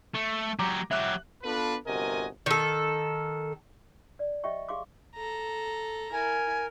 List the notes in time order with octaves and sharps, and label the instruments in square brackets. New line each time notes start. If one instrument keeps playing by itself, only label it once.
[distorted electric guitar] A3
[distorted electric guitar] F#3 G4 [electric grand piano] A#5 D6
[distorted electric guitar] F#3 G4 [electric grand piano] E5 F#6
[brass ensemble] B3 D4 F4 A4 B4
G1 C3 F#4 A#4 D#5 G#5
[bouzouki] D#3 A4
[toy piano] D5
G4 D#5 E5 G5 C#6
G4 G#4 F5 C6 D6
[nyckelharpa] A4 A#5
[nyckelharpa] E4 [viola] A#4 [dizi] G#5